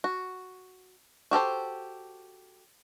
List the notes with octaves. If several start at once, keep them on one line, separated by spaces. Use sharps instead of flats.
F#4
F#4 G4 A4 C5